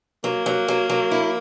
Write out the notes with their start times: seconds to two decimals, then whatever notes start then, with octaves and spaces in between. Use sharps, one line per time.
0.24 F#3 A#3
0.46 F#3
0.68 F#3
0.90 F#3
1.11 E4